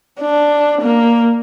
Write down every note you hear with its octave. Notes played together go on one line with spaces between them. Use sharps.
D4
A#3